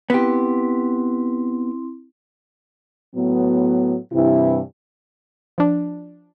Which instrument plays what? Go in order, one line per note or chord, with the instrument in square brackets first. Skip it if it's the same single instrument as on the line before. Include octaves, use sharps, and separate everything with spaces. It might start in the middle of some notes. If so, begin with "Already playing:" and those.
[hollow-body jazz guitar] B3 G4 [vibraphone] C4 E4 C6
[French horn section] A2 F#3 B3
G2 C3 E3 E4
[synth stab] F3 D4